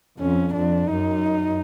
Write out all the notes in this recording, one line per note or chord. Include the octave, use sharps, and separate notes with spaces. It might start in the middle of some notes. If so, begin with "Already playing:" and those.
F2 C#4
F2 D4
F#2 D#4